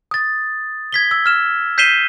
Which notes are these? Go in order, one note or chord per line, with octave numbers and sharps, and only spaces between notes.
D#6 A6
G#6 B6 G7
E6
F6 E7
G6 B6 C7 D#7 E7 G7